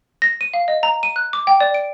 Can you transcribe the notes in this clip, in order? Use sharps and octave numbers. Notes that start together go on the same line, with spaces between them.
A#6
D#7
F5
D#5
A#5
D#7
F#6
D6
G5
D5
D7